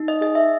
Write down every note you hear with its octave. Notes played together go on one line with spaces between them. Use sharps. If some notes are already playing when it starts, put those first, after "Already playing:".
Already playing: D#4
D#5
G#4 D#5
E5